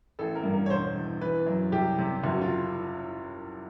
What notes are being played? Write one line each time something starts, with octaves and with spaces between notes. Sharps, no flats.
A1 A4
A#4
G2
A#4
C#5
E1 C5
E2
E3 B4
F#2
C2 G4
C3
F#1 F#4
F4